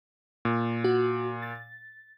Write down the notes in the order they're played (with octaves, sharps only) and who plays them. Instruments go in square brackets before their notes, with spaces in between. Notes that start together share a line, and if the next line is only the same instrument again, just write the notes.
[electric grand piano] A#2
[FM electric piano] F#4
A6